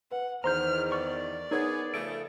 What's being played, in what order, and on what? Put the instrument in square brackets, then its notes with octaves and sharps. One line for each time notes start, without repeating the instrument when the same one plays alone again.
[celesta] B4 [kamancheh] F#5
[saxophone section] E2 D#3 [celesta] C5 [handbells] A#5 C6 G6 [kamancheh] F6
[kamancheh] D5 [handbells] C#6
[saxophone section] B3 G#4 [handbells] D#4 C#5 [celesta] A#4 G#6
[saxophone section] C#3 F3 A3 [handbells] D7